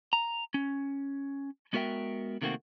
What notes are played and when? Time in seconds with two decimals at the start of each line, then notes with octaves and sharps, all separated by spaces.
0.13 A#5
0.54 C#4
1.73 G#3 B3 F#4 A#4 E5 G5
2.41 C3 D#3 A3 A#3 C4 F#4